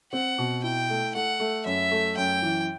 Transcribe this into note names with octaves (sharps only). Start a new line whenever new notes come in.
C4 F#5
B2
E4 G5
A3
A3 F#5
A3
F#2 E5
A3
F#2 G5
E3